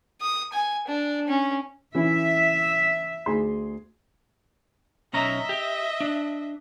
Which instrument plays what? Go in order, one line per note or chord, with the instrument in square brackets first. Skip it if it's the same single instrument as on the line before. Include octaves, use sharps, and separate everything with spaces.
[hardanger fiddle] D#6
G#5
D4
C#4
[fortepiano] E3 C#4 E4 [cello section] E5
[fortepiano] D2 G#4 C6
[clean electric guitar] B1 C#4 A#5 [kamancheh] D#5 E5
[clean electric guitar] G4
D4